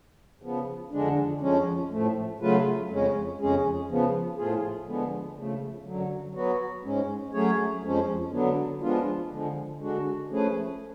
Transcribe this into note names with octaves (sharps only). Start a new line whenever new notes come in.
C#3 F3 B3
F2 D3 G#3 D4
F2 F3 G#3 C#4
A2 F3 A3
C#3 F#3 A3 F4 B4
F2 C#3 G#3 C#4
F2 C#3 G#3 C#4 G#4
C#3 F3 B3
A2 F3 A3 F4 G#4
D3 F3 G#3 B3
C#3 F3 A3
F#2 D3 F#3
F#3 B3 F#4
G#2 G#3 C#4
F#3 A3 C#4 G#4 C#5
F2 F3 G#3 C#4
D3 F#3 B3 D4
F3 G#3 B3 D4 F4
D3 F3 G#3
D3 G#3 D4 F#4
F3 A3 C#4 G#4 B4